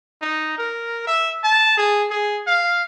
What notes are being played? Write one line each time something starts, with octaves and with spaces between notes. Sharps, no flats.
D#4
A#4
E5
A5
G#4
G#4
F5